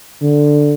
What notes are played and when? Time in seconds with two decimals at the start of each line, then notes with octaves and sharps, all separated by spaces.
0.22 D3